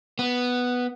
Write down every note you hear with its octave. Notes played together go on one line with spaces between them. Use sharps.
B3